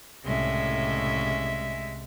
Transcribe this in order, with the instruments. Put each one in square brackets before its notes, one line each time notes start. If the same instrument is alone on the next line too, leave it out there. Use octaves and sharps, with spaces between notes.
[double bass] C2 [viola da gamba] A2 C#3 C#4 [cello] G#3 E5